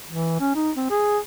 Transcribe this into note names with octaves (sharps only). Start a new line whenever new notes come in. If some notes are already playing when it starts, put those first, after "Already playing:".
E3
C#4
D#4
C4
G#4